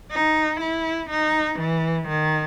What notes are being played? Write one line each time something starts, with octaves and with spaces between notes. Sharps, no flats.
D#4
E4
D#4
E3
D#3